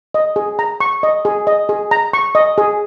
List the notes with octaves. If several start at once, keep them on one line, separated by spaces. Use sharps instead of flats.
D#5
G#4
A#5
C#6
D#5
G#4
D#5
G#4
A#5
C#6
D#5
G#4